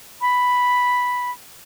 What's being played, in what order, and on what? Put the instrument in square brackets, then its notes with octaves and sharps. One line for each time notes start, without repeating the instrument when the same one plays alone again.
[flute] B5